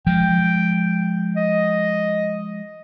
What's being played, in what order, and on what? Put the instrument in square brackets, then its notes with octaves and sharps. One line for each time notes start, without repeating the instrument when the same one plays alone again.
[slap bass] F3 G#3 [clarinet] G5
[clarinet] D#5